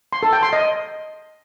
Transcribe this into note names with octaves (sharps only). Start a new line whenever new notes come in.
C6
A4
G5
C6
D#5